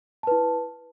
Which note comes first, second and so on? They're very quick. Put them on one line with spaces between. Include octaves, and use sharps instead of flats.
A5 B4 E4